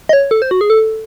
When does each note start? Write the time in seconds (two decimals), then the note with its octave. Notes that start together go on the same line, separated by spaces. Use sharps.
0.09 D#5
0.13 C#5
0.31 A4
0.42 C5
0.51 F#4
0.61 G#4
0.70 A4